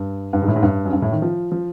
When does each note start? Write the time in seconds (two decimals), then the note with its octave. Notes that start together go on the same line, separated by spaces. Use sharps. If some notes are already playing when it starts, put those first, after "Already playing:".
Already playing: G2
0.33 G2
0.42 G#2
0.48 A2
0.56 G#2
0.63 G2
0.85 F#2
0.93 G2
1.02 A2
1.12 D#3
1.22 F3
1.52 F3